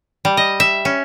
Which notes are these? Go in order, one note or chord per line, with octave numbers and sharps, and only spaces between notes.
G3
D#5
E5
C#4